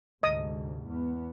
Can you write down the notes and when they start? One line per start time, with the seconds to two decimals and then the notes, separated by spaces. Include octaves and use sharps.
0.23 D2 G#2 C3 D#5 D#6
0.85 E2 B3